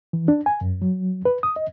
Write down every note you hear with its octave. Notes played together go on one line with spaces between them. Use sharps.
E3
D4
G#5
F#2
F#3
B4
D#6
D#5